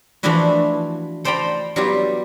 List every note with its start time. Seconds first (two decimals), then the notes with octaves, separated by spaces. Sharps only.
0.23 E3 F3 A3 D4 E4 F#4
1.24 A4 C5 D5 G5 A#5 B5
1.76 F#3 G3 B3 E4 F4 G4